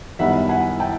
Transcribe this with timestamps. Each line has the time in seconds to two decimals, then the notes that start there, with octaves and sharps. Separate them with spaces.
0.19 F#2 D#3 G3 B3 D#4 E5 F#5
0.49 F#5 G#5
0.80 G5 A5